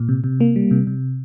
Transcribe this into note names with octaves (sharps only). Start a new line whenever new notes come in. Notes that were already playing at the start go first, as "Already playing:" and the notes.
Already playing: A#2
C3
C3
A#3
G3
C3
C3